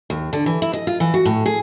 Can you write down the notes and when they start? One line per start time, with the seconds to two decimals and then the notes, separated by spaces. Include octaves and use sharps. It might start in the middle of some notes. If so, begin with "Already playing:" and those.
0.10 D#2
0.33 D3
0.46 E3
0.62 E4
0.73 D#5
0.87 F4
1.00 E3
1.14 F#4
1.25 A2
1.46 G#4